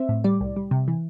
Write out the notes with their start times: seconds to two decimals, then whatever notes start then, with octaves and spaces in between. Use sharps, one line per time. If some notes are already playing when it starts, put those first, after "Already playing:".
Already playing: C4 E5
0.09 A2
0.24 G3 D5
0.41 C2
0.56 G3
0.71 C3
0.88 E3